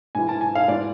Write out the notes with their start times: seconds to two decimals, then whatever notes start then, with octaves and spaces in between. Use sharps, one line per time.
0.15 G#2 E3 G#5
0.29 A5
0.41 G#5
0.55 F5
0.68 G#2 E3 D5